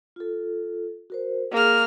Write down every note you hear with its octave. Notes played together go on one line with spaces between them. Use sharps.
F4 A4
F#4 A#4 C5
A#3 G#4 F6